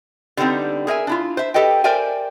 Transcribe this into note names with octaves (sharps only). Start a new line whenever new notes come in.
D3 G3 B3 C4 D#4
G#4 A#4 E5 G#5
D4 E4 F4
C5 E5
G4 A4 B4 D#5 G5
A#4 C5 D5 E5 G5 G#5